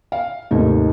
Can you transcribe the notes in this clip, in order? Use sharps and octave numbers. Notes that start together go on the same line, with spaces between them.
F5
D#2 G#2 C3 A3 D#4